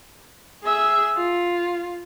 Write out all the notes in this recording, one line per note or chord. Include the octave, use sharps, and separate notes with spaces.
G#4 E5
F4